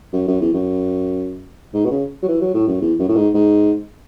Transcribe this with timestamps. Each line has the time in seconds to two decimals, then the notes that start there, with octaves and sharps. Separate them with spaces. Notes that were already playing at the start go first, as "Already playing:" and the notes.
0.13 F#2
0.27 F#2
0.41 E2
0.54 F#2
1.74 G#2
1.85 B2
1.91 C#3
2.22 F#3
2.28 E3
2.41 F#3
2.54 A2
2.67 F#2
2.81 E2
2.99 F#2
3.08 A2
3.16 G#2
3.34 G#2